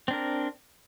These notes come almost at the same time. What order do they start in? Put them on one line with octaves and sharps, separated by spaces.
C4 D4 A#4